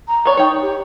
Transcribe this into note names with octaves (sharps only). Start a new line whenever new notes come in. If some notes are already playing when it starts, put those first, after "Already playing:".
A#5
B3 C#5 D5
D#4 C#5 G5
G4